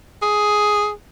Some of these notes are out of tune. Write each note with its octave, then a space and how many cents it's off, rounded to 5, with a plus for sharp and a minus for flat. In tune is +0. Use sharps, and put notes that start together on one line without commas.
G#4 +5